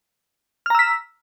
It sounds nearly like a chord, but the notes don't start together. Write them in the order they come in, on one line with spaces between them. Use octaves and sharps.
F6 A#5 E6 B6